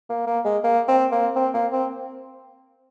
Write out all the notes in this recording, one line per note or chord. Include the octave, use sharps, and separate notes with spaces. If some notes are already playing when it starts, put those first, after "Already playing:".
A#3
A#3
G#3
A#3
C4
A#3
C4
A#3
C4